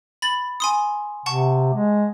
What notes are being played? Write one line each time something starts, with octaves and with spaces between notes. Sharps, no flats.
B5 A6 F#7
G#5 C6 D#6
C3 F#5 A5 C#6
G#3